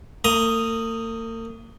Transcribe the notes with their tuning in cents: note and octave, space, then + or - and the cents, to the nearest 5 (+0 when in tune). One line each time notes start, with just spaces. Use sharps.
A#3 -45 A#5 +0 D#6 +0